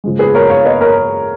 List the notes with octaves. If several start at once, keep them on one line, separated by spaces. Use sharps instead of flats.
C#3 F3 G#3
G#4 B4
A#4 C#5
C#5 F5
B4 D#5
A#4 C#5